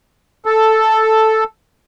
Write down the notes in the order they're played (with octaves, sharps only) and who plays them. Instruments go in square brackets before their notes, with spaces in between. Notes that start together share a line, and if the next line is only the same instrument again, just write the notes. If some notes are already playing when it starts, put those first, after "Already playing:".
[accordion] A4